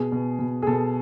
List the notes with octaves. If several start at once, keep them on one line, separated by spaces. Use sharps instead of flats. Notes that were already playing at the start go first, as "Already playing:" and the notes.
Already playing: B2 G#4
B2
B2
G#4
B2 A4